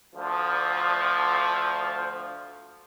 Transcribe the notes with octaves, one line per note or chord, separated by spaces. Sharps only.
D2 F3